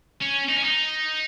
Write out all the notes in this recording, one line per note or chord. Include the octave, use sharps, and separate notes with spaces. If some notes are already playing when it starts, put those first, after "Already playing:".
C#4
D#4
C#4
D#4